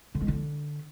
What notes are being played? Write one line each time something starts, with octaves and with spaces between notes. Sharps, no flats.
D3
G#3
D3